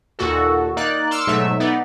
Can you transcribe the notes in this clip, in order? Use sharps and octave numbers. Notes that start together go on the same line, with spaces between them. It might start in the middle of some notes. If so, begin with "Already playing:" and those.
D#2 A#2 F#4 A4
A#3 D#4 D5 F#6
C6 D6 E6 F6 C#7
G#2 B2 F#3 A3 E5
B3 D#4 D5